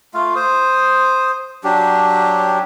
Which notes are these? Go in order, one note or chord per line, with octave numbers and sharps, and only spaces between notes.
A3 F4 F5
C5 D#6
F#3 D4 G4